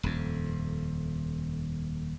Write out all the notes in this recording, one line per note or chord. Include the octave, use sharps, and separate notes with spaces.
D#1 F2